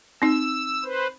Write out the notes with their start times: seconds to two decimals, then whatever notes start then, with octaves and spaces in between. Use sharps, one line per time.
0.22 C4 D#4 E6
0.84 B4 C5